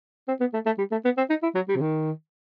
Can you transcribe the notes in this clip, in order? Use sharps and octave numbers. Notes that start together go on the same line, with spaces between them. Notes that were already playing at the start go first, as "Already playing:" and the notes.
C4
B3
A3
A3
G3
A3
B3
C4
D#4
E4
F#3
G3
C3
D#3